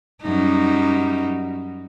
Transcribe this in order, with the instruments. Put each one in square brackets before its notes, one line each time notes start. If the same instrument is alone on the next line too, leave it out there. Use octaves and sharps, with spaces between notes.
[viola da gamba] F#2 G3 D#4